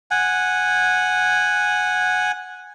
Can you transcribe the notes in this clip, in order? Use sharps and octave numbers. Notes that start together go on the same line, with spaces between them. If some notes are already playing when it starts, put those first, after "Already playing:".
F#5 G#5